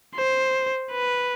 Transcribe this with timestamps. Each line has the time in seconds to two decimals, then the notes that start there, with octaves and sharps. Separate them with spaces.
0.15 C5
0.92 B4